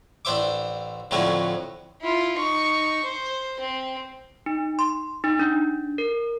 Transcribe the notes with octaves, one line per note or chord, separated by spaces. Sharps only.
A1 D4 C5 E5 D6
F2 A2 D3 F#3 A3 C#4
E4 F4
D#4 C#6
C5
C4
D#4
C6
D#4
D4
A#4